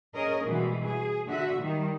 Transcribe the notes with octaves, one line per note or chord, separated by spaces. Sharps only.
C#4 G#4 A#4 D#5
B2 E3 G3 G#3
G#4
D3 F#4 E5
D#3 G3